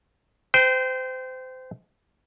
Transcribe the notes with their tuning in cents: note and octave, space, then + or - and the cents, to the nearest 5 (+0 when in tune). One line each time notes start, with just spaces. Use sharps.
C5 -25 G5 +0